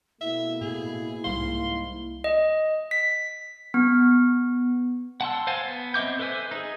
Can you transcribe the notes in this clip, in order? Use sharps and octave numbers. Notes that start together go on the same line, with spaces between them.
B2 A3 A#3 E4 E5
A2 G#4
C2 G#2 G3 A#3 F5 C6
D#5
B6
B3
F#5 A5 C6 E6
C5 F5 F#5 G#5 A5
B3
C4 D#5 E5 D6 G6
A4 B4 C5 E5 G#5
D#4 G#4